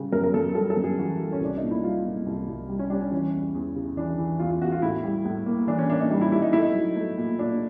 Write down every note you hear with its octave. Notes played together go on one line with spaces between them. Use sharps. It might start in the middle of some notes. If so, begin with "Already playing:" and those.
Already playing: C#3 G3
F#2 A#4
A#4
F#2 A4
G3 A4
A4
F#2
G#4
E3 F#4
G3
C#4
C2 D4
A#2 D#4
E4
G3 F4
A#2
C2
C2
G3
C#4
G3 D4
C#4
E3 C#4
E2
E2
C#3
E3 D4
E3
E2 F4
F4
E2 F#4
F4
A2 E4
G3
A2
A#3
E3 D4
C#4
A#3 D4
D#4
G3 D#4
E4
G3 E4
D#4
A3 E4
D#4
F#3
A3
A#2
A#2 D4